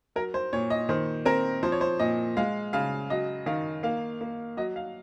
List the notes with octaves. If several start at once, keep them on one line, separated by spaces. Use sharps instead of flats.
F#3 A#4
C5
A#2 C#5
D#5
D#3 C5
C4 A#4
F3 C5
C#5
C5
A#2 D#5
G#3 F5
C#3 F5
F#3 D#5
D#3 F5
A#3 F5
A#3
F#3 D#5
F5